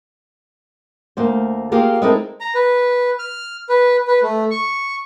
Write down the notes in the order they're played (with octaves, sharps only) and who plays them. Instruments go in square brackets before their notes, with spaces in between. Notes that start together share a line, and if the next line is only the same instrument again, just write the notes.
[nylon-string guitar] D2 A#3 C5
A#3 F4 G4 G#4 A#4
G#3 C4 D#4 E4 A4 A#4
[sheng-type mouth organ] A#5
B4
F6
B4
B4
A3
C#6